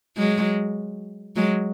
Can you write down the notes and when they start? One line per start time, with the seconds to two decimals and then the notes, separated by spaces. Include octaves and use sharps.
0.17 F#3 G#3
1.36 F#3 G#3